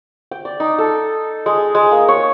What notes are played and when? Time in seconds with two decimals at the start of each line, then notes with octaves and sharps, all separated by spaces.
0.31 G5
0.45 D5
0.60 D#4
0.78 A4
1.46 G#3
1.75 G#3
1.91 A#3
2.08 C#5